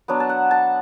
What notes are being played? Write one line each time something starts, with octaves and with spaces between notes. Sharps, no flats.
F#3 B3 D4
A5
F#5
A5